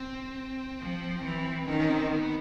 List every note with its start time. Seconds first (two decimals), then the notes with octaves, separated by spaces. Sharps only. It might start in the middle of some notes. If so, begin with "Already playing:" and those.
Already playing: C4
0.79 F3
1.23 E3
1.68 D#3 C#4
1.80 C#4
1.89 C4
2.12 B3